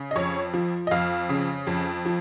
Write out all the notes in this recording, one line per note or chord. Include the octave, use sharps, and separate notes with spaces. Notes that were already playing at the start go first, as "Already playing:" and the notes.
Already playing: C#3
D#5
F2 C#5
F3
D#5
F2 F5
C#3
F2
F3